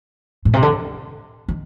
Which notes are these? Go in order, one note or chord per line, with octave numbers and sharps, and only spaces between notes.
A2
C3
D3
D#3